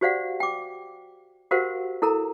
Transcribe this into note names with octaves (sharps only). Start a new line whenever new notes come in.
F#4 G4 C5 D5 F5 F#5
G5 D6
F#4 G4 A#4 C5 F5 F#5
E4 A4 A#4 A#5